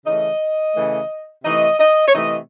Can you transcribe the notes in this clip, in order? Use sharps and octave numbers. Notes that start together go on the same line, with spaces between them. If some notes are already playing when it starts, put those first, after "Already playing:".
C#3 E3 A3 D#5
C#3 E3 A3
C3 E3 A3 D#5
D#5
C#5
C3 E3 A3 D#5